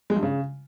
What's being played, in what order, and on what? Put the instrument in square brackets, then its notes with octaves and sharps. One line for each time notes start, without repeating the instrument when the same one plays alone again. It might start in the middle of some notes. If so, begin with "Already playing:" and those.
[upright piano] G#3
G2
C#3